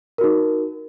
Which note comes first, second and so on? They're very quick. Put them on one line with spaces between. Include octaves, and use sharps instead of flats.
A#4 F#4 D#4